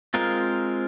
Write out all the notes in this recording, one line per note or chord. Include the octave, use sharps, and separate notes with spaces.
G#3 C4 F4 A#4